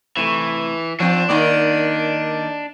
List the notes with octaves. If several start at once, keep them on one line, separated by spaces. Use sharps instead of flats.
C3 E3 A3
F3 C4 D4
D#3 A#3 D5